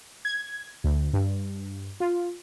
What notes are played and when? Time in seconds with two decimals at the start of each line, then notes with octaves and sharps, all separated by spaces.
0.25 G#6
0.84 D2
1.13 G2
2.00 F4